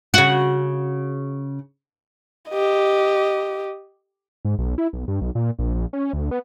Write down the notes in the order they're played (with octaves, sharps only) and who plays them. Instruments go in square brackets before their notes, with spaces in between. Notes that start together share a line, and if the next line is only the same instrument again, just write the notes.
[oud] C#3 F#4
[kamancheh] G4 D#5
[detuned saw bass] G#2
B1
E4
B1
G2
B1
A#2
A#1
A#1
C#4
D2
B3